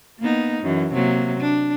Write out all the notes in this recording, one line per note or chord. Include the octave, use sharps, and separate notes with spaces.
A#3 B3 D#4
F#2 E3
C3 F#3 A#3
D4